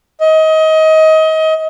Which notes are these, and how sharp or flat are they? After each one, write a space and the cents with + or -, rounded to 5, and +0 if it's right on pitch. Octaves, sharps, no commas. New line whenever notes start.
D#5 +25